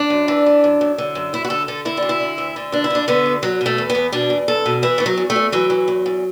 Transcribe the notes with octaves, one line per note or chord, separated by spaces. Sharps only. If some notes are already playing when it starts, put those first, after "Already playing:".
Already playing: D4
F#2
E3
E3
F#2
F#2
D3
F#2
F#2 E4
F#4
D3 A4
D3 A4
D3 E4
D4
D2
E4
D3
D2
D3
D2 D4
E4
D3 D4
D3 B3
D2
E2 F#3
B2 A3
E2
B3
E2
B2 D4
E2
E2 A4
B2
E3 E4
E3 A3
F#3
E2
A3
E2
E3 F#3
E3
E2
E2